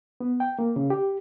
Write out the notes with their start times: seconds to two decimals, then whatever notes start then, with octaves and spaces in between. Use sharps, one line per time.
0.20 B3
0.40 G5
0.59 A#3
0.76 C#3
0.90 G4